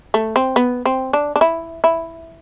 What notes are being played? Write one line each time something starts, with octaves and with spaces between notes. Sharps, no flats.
A3
C4
B3
C4
D4
D4
E4
E4